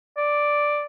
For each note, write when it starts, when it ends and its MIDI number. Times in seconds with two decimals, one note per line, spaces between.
0.17 0.85 74